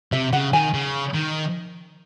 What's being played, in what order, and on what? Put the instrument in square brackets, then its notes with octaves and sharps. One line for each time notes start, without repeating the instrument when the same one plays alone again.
[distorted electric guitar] C3 [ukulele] E5
[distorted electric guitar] C#3 [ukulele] F#5
[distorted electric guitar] D#3 [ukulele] G#5
[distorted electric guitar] C#3
D#3